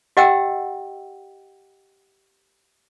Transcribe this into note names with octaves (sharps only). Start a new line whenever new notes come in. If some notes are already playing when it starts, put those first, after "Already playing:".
G4 D#5 F#5 G5 E6